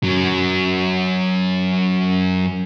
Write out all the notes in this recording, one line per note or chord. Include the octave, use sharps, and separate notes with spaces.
F#2 F#3